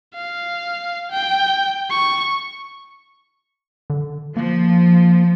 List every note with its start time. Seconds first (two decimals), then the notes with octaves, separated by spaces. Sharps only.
0.14 F5
1.11 G5
1.90 C#6
3.90 D3
4.37 F3 A#3